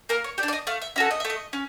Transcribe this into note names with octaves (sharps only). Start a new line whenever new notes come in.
A#3 A#4
C#5
G4 D5
D4
D5
D#5
A3 F5
E5
C#4 F#4 A4 E5
D#5
A3 E5
D#5
C#4